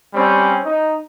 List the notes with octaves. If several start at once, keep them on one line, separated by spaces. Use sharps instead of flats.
G3 C4 C#4
D#4